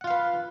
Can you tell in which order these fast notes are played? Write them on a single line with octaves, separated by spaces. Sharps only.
F#5 F4 F5 B4